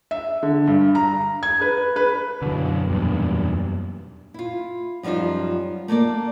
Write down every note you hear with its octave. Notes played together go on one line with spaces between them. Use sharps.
E5
D3
G2
A#5
G#6
B4
B4
F#2 B2 D3 F#3
E2 G2 A#2
E4 F4
F#2 F3 G3 D#4 F4
A3 A#3 A4 D5